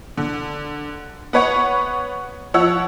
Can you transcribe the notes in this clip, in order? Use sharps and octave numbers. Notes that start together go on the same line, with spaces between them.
D3
B3 B4 C#5 F#5 C#6
F3 C#5 F#5 E6